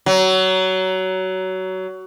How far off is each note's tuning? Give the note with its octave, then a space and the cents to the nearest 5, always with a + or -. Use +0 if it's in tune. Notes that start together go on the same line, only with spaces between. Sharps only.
F#3 +20